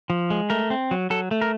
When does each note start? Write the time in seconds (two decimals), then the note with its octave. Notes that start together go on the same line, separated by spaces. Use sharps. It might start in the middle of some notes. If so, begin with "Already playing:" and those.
0.10 F3
0.30 G#3
0.50 A3 A#4
0.70 C4
0.91 F#3
1.10 F#3 A4
1.31 A3
1.41 A#4